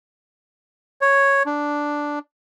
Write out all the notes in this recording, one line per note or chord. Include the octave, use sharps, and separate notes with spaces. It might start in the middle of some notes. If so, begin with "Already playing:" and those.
C#5
D4